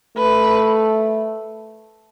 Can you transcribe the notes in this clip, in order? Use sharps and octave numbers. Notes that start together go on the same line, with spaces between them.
A3 B4